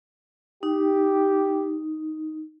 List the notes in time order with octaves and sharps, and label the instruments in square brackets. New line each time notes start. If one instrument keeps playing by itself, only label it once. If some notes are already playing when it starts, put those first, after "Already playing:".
[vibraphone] D#4 [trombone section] G4